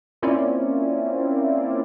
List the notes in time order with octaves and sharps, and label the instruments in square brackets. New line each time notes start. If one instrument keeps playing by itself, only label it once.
[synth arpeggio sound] A#3 C4 C#4 E4 F4 D5